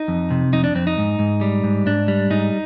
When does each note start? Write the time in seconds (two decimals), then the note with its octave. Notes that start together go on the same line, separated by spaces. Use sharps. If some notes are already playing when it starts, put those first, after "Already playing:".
Already playing: D#4
0.08 F2
0.31 C3
0.53 F2 D#4
0.64 D4
0.75 F2 C4
0.87 D#4
0.98 G#2
1.19 G#2
1.41 G3
1.64 G#2
1.86 G#2 D4
2.08 G3
2.30 G#2 D#4